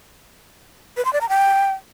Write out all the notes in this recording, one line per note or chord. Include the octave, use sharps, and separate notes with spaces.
B4
C6
D5
A#5
G5